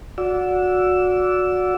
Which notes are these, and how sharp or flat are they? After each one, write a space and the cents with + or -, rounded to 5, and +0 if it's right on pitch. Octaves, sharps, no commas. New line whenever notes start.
F#4 -20 D5 -20 E6 +5